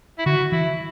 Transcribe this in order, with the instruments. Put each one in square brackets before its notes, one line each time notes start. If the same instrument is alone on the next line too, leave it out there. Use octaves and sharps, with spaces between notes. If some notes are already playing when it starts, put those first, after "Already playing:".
[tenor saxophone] E4
[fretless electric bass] D3 [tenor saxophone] F#4
[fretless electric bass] E3 [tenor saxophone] E4